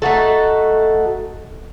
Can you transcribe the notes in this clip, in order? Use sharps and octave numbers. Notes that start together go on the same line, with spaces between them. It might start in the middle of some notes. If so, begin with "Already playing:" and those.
A3 D#4 F#4 A4